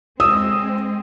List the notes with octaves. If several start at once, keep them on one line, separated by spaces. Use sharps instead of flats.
G#3 C4 D#6 E6